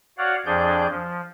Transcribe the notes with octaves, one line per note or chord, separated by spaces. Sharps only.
F#4 C#5 D5 F5 F#5
F2 F3 D4 G#4 D5 G6
F3